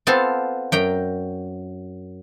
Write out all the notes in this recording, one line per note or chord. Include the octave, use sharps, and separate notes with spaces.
B3 C4 F4 A4 A5
F#2 G5 A#5